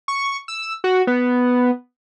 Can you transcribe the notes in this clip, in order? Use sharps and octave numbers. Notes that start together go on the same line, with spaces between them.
C#6
E6
F#4
B3